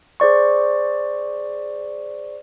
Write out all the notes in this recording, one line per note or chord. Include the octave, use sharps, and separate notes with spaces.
G#4 C5 D5 C#6